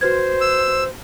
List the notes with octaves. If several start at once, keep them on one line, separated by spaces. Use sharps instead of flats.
F#4 B4 C5 G#6
E6